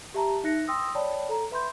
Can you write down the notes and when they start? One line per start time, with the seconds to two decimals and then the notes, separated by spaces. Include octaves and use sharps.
0.14 G4 E5 A5 A#5
0.44 D#4 E5 F#6 A#6 C#7
0.67 G5 C6 D#6 E6 A#6
0.95 C#5 D5 G5 A5 B5
1.29 A4 A#5
1.51 B4 E5 B5 C6 G6